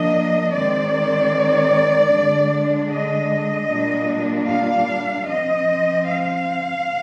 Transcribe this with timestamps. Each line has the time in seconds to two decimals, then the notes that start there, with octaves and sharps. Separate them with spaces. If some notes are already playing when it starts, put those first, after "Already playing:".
Already playing: F3 A#3 D4 D#5
0.52 D#3 G#3 C4 D5
2.11 D3 G#3 D4
2.90 D#5
3.70 A#2 G3 D4
4.49 F5
5.27 F3 C4 D#5
6.07 F5